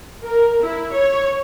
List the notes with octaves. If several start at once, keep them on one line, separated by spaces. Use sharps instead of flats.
A#4
E4
C#5